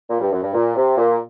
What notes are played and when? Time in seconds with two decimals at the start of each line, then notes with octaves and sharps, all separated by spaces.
0.10 A#2
0.21 G2
0.32 F#2
0.43 G2
0.54 A#2
0.77 C3
0.98 A#2